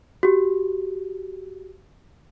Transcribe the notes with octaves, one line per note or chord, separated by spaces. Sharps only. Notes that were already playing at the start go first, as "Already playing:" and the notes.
F#4 G4